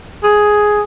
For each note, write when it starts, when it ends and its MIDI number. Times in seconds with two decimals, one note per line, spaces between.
0.23 0.81 68